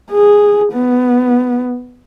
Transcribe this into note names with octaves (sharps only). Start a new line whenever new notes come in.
G#4
B3